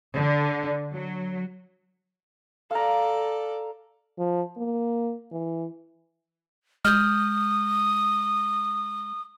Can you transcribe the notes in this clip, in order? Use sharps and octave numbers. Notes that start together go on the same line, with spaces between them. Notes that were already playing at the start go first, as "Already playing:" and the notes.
D3
F#3
A4 D5 F5 A#5
F3
A#3
E3
G#3 D#6 F6 G6